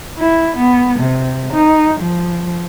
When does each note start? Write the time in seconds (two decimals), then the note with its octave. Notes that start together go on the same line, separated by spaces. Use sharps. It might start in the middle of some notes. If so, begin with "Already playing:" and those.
0.18 E4
0.56 B3
0.99 C3
1.53 D#4
1.99 F3